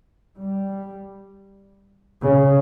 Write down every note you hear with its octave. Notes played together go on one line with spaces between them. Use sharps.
G3
C#3